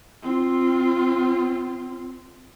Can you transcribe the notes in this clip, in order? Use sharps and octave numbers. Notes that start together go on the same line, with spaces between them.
C4 F4